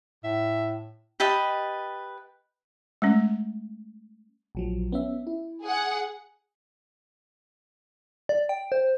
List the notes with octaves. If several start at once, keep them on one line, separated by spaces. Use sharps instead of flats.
A2 E5
G4 B4 D#5 A5
G#3 A3 C#4
A#1 F3 F#3
B3 C#4 E5
E4
G#4 F#5
D5
G5
C5